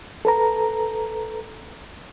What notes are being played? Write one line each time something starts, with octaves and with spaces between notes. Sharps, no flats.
A4 B4 A#5